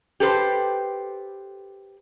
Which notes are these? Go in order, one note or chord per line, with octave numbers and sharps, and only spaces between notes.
G4 A4 B4 C5